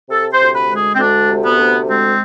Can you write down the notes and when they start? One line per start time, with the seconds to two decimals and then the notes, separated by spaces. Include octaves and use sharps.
0.09 C3 A4
0.32 C5
0.40 D2
0.54 B4
0.69 G#3
0.77 G#4
0.94 C4
0.99 D2 D4
1.29 C3
1.44 B3
1.59 D2
1.88 G#3 C4